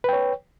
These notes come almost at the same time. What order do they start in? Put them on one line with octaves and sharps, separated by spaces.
B4 G5 C#5